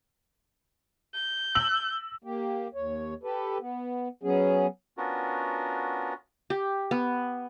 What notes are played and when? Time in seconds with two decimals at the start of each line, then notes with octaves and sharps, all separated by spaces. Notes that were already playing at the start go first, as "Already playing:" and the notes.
1.14 G6
1.55 E6 F#7
2.24 A#3 G4
2.75 D#2 C#5
3.23 G4 A4 B4
3.60 B3
4.23 F#3 B3 C#4 G#4
4.97 B3 C#4 D4 F4 F#4 A#4
6.50 G4
6.91 B3